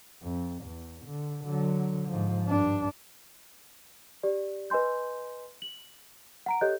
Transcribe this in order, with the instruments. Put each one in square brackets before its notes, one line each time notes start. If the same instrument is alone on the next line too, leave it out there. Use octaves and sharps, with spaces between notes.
[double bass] F2
E2
D3
D3 F#3
G#2 F3
G2 D4
[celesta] G4 D5
B4 D#5 G#5 C6 G6
F#7
F#5 A#5 D7
G4 A4 C#5 D#5 F#6 G6